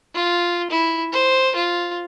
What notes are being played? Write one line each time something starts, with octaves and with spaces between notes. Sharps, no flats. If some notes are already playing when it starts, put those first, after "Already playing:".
F4
E4
C5
F4